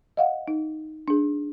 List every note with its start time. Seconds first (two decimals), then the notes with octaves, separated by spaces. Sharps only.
0.17 D#5 F5 F#5
0.48 D#4
1.08 D4 G#4